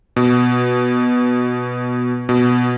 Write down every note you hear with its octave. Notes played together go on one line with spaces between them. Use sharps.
B2
B2